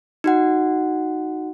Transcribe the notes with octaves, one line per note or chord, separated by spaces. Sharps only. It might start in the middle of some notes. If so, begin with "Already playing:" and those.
D#4 F#4 F#5